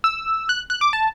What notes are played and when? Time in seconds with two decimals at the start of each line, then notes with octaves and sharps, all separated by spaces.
0.04 E6
0.49 F#6
0.70 F#6
0.81 D6
0.93 A5